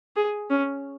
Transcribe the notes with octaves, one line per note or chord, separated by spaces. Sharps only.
G#4
C#4